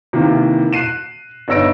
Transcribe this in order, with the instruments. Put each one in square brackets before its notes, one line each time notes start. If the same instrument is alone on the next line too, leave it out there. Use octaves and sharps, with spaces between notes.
[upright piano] C3 D#3 E3 A#3
F#6 C7 D#7 E7
G1 D#4 C#5 E6 A#6 D7